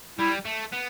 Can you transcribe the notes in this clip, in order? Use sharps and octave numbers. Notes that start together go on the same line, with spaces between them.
G3 E4
A3
B3